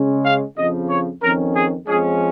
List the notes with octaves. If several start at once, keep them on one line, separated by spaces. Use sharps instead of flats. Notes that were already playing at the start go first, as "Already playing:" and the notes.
Already playing: C#3 G#3 C#4
F5
F2 C#3 F3 D#5
C#5
F2 D#3 C#4 A#4
G#4
F2 F3 G#3 C#4 G#4